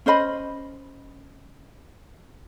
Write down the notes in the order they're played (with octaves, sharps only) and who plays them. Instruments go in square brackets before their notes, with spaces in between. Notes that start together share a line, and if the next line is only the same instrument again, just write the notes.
[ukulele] C#4 C5 D#5 B5